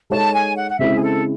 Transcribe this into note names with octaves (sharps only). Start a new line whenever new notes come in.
G#3 D#4 A4 C#5 A5
G#5
F#5
F#5
C#3 G#3 C4 E4 E5
G#4
A4